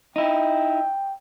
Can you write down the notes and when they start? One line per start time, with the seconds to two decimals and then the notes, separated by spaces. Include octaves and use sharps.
0.16 D#4 E4 G5